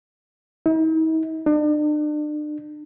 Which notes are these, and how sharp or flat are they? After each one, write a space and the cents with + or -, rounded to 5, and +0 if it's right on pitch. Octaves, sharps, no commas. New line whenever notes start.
D#4 +45
D4 +40